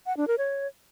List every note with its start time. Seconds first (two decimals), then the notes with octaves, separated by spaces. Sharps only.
0.06 F#5
0.17 D4
0.28 A#4
0.38 C#5